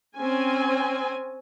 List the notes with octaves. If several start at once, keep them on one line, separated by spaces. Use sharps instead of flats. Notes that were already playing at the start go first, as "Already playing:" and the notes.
C4 C#4 G#5